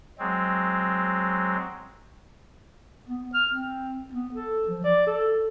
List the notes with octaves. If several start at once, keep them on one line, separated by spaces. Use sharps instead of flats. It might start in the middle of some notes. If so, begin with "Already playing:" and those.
F#3 G#3 C4
B3
F6
C4
B3
A4
F3
D5
A4